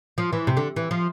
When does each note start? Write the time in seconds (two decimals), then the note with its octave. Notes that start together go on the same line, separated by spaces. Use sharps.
0.18 F3
0.33 E3
0.47 C3
0.57 D3
0.76 E3
0.91 F3